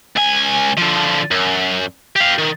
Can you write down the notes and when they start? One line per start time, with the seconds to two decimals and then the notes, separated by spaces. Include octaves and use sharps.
0.16 C#2 G#5
0.77 D3 F3
1.31 F#2
2.16 G4 F5
2.38 D#3